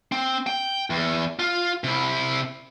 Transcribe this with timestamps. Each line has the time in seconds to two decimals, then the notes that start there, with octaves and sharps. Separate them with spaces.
0.12 C4
0.47 G5
0.90 E2
1.39 F4
1.84 C3 E4